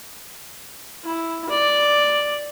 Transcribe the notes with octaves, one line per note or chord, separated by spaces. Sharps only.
E4
D5